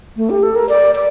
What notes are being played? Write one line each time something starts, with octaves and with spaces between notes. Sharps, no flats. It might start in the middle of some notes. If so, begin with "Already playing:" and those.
A3
G4
A4
A#4
D5
D5